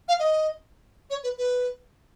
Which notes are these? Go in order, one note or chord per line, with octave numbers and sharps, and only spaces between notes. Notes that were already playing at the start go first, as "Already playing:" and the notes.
F5
D#5
C#5
B4
B4